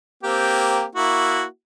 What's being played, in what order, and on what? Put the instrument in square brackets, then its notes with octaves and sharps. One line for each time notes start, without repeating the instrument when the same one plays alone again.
[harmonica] A#3 C4 G4
A#3 E4 F#4